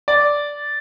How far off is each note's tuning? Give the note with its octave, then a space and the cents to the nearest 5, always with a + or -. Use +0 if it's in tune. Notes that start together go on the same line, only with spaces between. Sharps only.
D5 -5